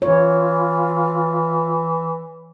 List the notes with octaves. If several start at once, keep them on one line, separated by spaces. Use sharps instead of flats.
E3 F4 C#5